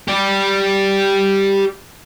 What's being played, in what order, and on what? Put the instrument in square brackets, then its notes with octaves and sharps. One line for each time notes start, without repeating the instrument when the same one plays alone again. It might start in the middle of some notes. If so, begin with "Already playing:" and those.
[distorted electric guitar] G4 D5